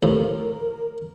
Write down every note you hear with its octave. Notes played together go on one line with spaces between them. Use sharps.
D#2 A2 F3 A#4